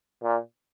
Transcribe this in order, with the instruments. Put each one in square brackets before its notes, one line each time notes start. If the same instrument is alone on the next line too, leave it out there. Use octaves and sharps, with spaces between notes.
[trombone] A#2